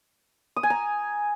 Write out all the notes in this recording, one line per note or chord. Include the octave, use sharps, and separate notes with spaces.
D#6
G#5
A#5